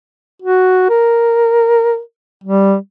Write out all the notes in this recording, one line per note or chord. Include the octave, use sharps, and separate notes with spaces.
F#4
A#4
G3